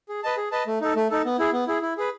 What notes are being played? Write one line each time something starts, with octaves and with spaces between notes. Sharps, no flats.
G#4
B4 D#5 A5
G#4
B4 D#5 A5
A3
D#4 A4
A3
D#4 A4
B3
E4 G#4
B3
E4 G#4
E4
G#4 B4